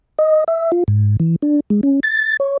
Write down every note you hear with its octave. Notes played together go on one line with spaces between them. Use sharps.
D#5
E5
F4
G#2
E3
D4
G#3
C#4
A6
C#5